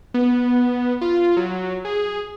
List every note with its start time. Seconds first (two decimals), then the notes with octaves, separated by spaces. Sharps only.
0.14 B3
1.01 F4
1.37 F#3
1.85 G#4